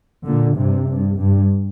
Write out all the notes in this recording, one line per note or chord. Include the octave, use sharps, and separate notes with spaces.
A#2 D3
G2 C3
G2
G2